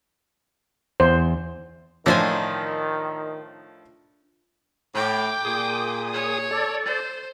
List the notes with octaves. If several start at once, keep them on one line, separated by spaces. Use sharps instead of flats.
E2 C5
A2 D#3 F3 D4 C5 G#5
A2 G5 D6
A#2 G#4 D#6
C#5
A4 D5
C5